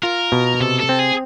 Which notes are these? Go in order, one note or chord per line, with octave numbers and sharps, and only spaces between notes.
F4 A#4
B2
C3 A4
A4
C4
G#4